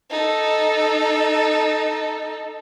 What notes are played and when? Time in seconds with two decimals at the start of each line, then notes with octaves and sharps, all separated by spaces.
0.11 D#4 A4